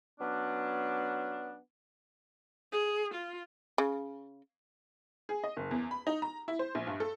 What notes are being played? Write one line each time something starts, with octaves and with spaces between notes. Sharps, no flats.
F#3 B3 C#4 D4
G#4
F4
C#3
G#4
D#5
F#1
E2
B5
D#4
A#5
E4
C5
A#1
G2
A4